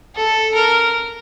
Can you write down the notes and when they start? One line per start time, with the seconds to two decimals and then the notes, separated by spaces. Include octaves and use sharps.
0.16 A4
0.54 A#4